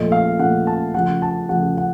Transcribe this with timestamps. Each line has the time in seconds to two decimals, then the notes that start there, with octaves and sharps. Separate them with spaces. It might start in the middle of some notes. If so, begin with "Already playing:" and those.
Already playing: A#2 F3 A3 D#5
0.12 F5
0.39 A#2 F3 A3 F#5
0.67 A5
0.94 C#3 F3 A3 F#5
1.22 A5
1.49 C#3 F3 A3 F#5
1.77 F#5